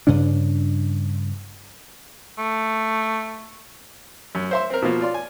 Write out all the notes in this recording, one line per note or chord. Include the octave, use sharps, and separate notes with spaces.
G2 C#3 C#4 D4
A3
F#2
C5 E5 C6
C4 A#4
B2 F3 A#3 F4
F4 D5 C6
G#5